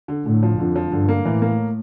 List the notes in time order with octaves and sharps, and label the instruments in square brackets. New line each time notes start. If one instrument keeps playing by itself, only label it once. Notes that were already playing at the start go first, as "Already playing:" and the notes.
[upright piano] D3
[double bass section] A2 [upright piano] D3
[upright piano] F3
[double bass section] F2 [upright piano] D3
[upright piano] F3
[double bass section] G2 [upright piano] D3
[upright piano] A#3
[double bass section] A2 [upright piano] E3
[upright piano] A#3